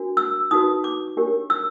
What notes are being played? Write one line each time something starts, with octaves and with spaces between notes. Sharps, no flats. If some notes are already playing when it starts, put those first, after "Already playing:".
Already playing: D4 F#4 A#4
E6
D#4 F#4 B4 D#6
D6
D4 G4 A#4 C#5
E6